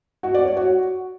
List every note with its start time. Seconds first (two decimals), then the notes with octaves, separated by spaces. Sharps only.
0.23 F#4
0.34 D5
0.46 C#5
0.57 F#4